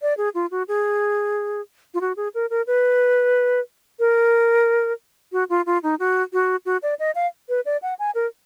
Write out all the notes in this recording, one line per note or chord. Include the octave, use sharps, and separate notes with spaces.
D5
G#4
F4
F#4
G#4
F4
F#4
G#4
A#4
A#4
B4
A#4
F#4
F4
F4
D#4
F#4
F#4
F#4
D5
D#5
F5
B4
D5
F#5
G#5
A#4